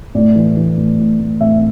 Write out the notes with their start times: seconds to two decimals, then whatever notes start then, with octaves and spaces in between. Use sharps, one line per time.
0.15 A2 D5
0.35 E3
0.57 E3
0.77 A2
0.98 A2
1.20 A2
1.41 A2 E5